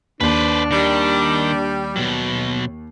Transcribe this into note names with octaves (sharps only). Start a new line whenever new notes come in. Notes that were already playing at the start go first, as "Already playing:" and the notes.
D#2 D4 B4 C5
D#3 G3
B2 F#3